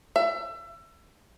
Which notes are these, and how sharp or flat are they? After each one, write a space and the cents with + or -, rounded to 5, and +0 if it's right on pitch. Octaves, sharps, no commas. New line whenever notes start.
E5 +30